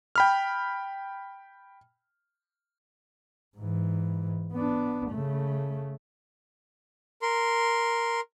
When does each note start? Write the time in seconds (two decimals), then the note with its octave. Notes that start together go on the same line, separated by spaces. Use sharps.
0.16 G5 B5 F6
3.57 G#2 E3
4.53 B3 D4
5.11 C#3 A3
7.22 A#4 C6